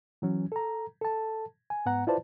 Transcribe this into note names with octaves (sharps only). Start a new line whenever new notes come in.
E3 F#3 C#4
A4 A#5
A4 A5
G#5
G#2 B3 F#5 A#5
E4 F4 B4 C5 D5 A5